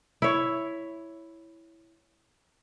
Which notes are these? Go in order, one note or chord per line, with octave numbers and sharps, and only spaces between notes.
E4 C#5